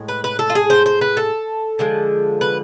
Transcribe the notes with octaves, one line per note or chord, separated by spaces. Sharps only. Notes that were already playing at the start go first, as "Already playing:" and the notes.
Already playing: A2 G#3
B4
B4
A4
F4
G#4
C5
C5
B4
A4
D3 F3 G#3
B4